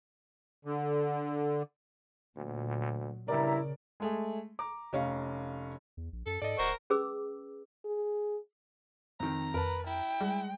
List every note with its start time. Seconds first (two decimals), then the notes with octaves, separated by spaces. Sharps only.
0.65 D3
2.36 D2 A#2 F#3
3.28 G2 C#3 E4 A#4 D5 E5 A#5
4.00 G#3 A3 G#4
4.59 A#5 D6
4.93 F1 C#4 F5
5.97 E2
6.13 A#1
6.26 F#2 A4
6.42 G#2 A4 D5 D#5
6.59 D1 A#4 C5 F#5 C#6
6.90 C#4 G#4 B4 D6 E6
7.85 G#4
9.20 F2 D#3 A#5
9.54 F2 A#4 B4 A5
9.87 E4 G5
10.21 G3 G#3